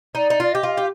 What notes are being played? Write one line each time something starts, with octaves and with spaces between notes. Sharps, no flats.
D#4 D5
D#4
F4 D5
G4 D#5
F4
G4